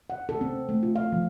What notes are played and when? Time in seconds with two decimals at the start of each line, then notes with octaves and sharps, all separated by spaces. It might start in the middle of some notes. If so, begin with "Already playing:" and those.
0.10 F#5
0.29 A4
0.41 C4
0.69 A3
0.83 F4
0.95 F5
1.12 F3